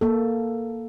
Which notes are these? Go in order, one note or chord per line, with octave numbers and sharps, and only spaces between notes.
A#3 A4